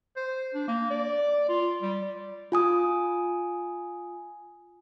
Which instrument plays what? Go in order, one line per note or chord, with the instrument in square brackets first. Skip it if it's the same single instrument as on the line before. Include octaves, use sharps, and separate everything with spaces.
[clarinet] C5
D4
A#3
D5
F4
G3
D5
[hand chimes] F4 G#5 D#6